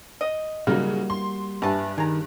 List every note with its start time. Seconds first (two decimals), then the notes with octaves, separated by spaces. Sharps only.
0.21 D#5
0.67 C#3 F#3 G3 A#3 D#4 F4 F#4
1.10 C6
1.62 G2 E3 A5
1.98 D#3 G#4 A#5